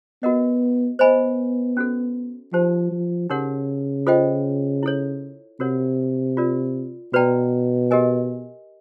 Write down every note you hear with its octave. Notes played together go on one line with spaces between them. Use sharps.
B3 F#4 A#4 D#5 F#5
B3 C5 D#5 G#5 B5
C#4 F#4 A4
F3 D#4 G4 C5 F5 A5
F3
C#3 D#4 G4 A#4 C#5 F#5
F4 A4 C5 D#5 G5
E4 A4 C#5
C3 F#4 A#4 C#5 F#5
F4 A#4 D5
B2 F#4 B4 D5 G5 A#5
G4 A#4 D#5 G#5